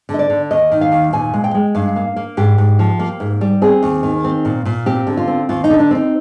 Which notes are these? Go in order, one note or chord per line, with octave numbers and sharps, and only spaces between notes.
D3
D#5
D5
D3
D#2 D#5
D#3
F5
D#2
A#2 G#5
G#3
G5
G#3
G2 F5
A#3
A#3
G#2 G4
G#2
F3
A#3
G#2
G3
C4 G#4
D#2
D#3
C4
A#2
A#2
C4 G4
D3
F4
C4
D#2 F4
D#4
D3
D4
C4 D#4